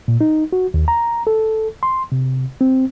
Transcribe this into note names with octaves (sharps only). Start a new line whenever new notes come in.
A#2
D#4
F#4
D#2
A#5
A4
C6
C3
C4